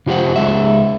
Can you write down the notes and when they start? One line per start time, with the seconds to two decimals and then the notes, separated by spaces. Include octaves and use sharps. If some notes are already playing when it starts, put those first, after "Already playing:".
0.06 C#3 F4 G4 C5 F#5
0.36 C#2 G#3 E5